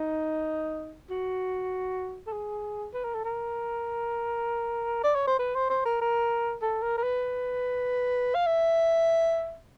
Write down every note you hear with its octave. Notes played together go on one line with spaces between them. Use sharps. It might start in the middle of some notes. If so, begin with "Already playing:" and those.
Already playing: D#4
F#4
A4
G#4
B4
A#4
A4
A#4
D5
C#5
C5
B4
C5
C5
A#4
A#4
A4
A#4
A#4
B4
F5
E5